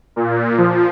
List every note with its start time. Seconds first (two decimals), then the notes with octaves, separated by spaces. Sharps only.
0.16 A#2
0.58 F3